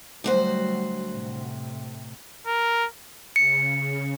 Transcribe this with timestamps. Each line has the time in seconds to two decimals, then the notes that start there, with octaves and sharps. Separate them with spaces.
0.24 D2 F#3 G3 F#4 C5
1.11 A2 C3
2.46 A#4
3.36 C#3 C#7